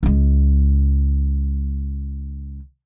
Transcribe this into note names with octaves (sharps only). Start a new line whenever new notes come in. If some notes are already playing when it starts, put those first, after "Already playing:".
C#2 G#3